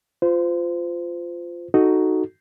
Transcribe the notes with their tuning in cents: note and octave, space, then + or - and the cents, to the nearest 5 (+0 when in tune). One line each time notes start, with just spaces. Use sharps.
F4 -5 C5 -25
D#4 +0 F#4 +0 A4 +0